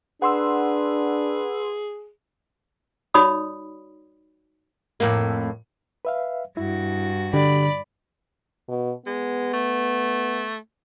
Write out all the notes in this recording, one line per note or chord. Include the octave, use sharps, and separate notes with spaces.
D4 G#4 B4 F#5 C6 E6
D#4 F#4 C#5 D5 B5 D#6
F2 A2 A#3
B4 E5 F5
G2 E4 F#4
D3 G4 D5 B5
B2
G#3 B3
A3